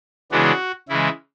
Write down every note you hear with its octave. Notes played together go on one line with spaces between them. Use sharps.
C#3 E3 G#3 B3 D4 F#4
C#3 E3 G#3 E4